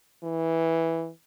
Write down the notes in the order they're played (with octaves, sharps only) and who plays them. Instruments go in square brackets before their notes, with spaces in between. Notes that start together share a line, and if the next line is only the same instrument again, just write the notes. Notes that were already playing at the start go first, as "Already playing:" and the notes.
[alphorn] E3